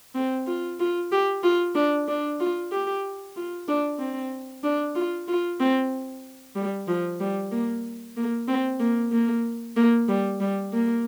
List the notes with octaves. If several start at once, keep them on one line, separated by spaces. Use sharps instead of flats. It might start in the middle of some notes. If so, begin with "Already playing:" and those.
C4
F4
F4
G4
F4
D4
D4
F4
G4
F4
D4
C4
D4
F4
F4
C4
G3
F3
G3
A#3
A#3
C4
A#3
A#3
A#3
G3
G3
A#3